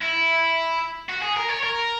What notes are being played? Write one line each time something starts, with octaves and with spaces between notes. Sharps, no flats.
E4
F#4
G#4
A#4
C#5
A#4